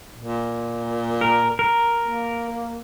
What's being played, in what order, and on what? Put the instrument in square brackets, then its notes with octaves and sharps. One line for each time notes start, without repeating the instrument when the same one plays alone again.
[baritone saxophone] A#2
[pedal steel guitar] A#4
A#4
[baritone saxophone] A#3